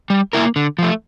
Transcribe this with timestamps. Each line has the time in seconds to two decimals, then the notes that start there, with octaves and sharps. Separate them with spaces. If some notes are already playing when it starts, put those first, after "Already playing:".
0.10 G3
0.33 A#3 E4 A#4
0.56 D3
0.78 F3 A3